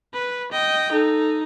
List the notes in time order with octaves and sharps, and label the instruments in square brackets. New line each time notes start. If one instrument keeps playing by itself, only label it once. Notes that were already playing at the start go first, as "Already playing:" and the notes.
[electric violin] B4
D#5 G5
[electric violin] D#4 [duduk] A4